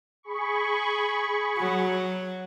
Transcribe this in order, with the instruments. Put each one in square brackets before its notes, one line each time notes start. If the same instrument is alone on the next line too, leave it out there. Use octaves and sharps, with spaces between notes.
[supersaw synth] G#4 B5 C#6
[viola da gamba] F#3